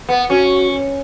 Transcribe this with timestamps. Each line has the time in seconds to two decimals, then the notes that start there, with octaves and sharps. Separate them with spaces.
0.09 B3
0.30 C#4 F#4